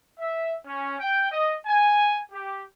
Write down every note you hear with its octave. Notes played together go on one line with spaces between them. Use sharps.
E5
C#4
G5
D#5
G#5
G4